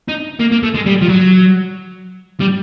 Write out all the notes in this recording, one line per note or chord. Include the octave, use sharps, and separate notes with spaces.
D#4
A#3
A#3
A3
G#3
G3
F3
F#3
G3